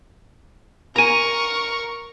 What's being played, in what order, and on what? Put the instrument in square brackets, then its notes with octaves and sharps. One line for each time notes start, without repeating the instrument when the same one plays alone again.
[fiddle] A#4 C#6 [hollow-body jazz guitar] G#5 A#5